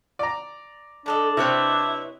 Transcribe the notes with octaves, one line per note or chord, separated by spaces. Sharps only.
D5 A#5
A2 D4 A4 D#5
C3 C4 E4 B4 C#5 D#5